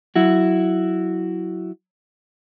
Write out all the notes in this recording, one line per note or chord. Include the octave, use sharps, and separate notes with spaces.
F#3 E4 F#4